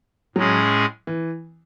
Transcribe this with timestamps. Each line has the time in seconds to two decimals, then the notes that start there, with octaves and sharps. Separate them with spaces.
0.36 A2 F#3 G#3 C#4 G#4
1.07 E3